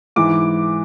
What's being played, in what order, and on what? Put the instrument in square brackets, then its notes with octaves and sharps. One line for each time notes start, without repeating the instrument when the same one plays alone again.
[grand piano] G#2 E3 D6